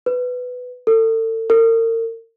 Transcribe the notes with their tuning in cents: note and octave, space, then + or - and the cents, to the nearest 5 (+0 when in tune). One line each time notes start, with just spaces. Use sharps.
B4 +10
A4 +35
A#4 -40